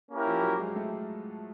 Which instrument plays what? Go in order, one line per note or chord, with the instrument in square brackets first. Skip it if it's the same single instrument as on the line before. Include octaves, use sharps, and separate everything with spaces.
[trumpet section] A#3 C#4 E4 G4 A#4
[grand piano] F3 F4
F#3 F#4
G#3 G#4
A3 A4